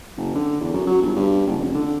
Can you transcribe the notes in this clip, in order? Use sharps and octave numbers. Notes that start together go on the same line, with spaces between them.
F#1
D3
E2
F#2
F#3
G1
G2
F#1
F1
D3